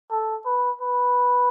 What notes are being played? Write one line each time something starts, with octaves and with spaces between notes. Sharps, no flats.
A4
B4
B4